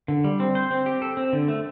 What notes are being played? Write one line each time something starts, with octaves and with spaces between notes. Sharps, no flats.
D3
G3
C4
C5
C4
G4
A4
C4
D3
A3